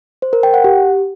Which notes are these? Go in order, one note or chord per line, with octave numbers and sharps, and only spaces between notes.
C5
A#4
G5
F#5
G4